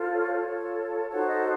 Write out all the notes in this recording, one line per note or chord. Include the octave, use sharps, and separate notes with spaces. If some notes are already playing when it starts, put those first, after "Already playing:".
Already playing: F4 A4 C5
C#5
F4 A4 C#5
D#4 F#4 A4 C5 C#5
D#5